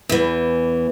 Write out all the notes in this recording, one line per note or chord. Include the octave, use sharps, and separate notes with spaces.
E2 E3